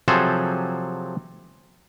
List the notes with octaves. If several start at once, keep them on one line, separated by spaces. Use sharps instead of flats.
C3 F3 F#3 G#4 A4 C5